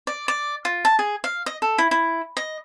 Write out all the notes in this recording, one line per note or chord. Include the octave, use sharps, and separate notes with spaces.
D5
D5
F4
A5
G#4
F5
D#5
A4
E4
E4
D#5